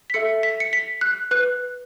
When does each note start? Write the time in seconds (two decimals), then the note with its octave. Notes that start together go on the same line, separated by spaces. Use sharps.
0.10 B6
0.14 A4 E5 C#7
0.43 B6
0.60 C#7
0.73 B6
1.01 F#6
1.31 B4 F#6